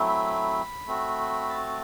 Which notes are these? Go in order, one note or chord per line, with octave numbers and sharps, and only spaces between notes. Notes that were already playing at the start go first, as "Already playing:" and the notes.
Already playing: F#3 A3 C4 E4
B5
A3 C4 F#4
A5